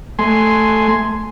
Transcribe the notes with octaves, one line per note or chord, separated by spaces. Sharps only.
A3 G#5 C6